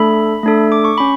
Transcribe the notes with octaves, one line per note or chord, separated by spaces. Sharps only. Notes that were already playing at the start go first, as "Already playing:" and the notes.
Already playing: A3 D4 A4 B5
A3 D4 A4
D6
C#6
C#4 B5